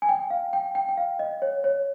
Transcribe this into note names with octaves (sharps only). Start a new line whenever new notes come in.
G#5
G5
F5
G5
G5
G5
F5
D#5
C#5
C#5